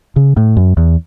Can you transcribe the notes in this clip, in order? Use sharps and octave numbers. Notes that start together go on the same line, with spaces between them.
C#3
A2
F#2
E2